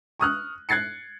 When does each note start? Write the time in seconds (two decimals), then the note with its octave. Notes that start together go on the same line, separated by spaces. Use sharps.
0.20 C#6 D#6 F6 F#6
0.69 F#6 G#6 A6 C7 C#7